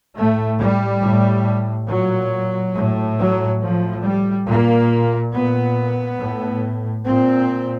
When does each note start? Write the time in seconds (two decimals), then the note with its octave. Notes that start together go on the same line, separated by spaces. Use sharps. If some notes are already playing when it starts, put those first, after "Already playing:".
0.17 A2 A3
0.59 G3
1.03 A2
1.89 A#2 F#3
2.75 A2
3.18 F#3
3.61 A2 F3
4.04 G3
4.47 A#2 A#3
5.33 A#2 B3
6.20 A2
7.06 A#2 C4